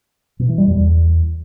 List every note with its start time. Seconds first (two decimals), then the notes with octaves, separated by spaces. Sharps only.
0.39 B2
0.49 E3
0.58 G3
0.67 F2
0.76 E2